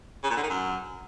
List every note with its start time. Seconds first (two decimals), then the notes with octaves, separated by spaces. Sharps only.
0.23 C#3
0.30 A#2
0.37 D3
0.43 D#3
0.50 F#2